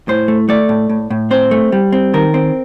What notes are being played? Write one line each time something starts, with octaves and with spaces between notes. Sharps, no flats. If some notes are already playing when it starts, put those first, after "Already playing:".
A2 C5
A3
A3 D5
A2
A2
A2
C4 C5
A3
G3
C4
D#3 A#4
C4